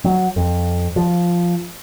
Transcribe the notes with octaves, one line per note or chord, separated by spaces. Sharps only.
F#3
F2
F3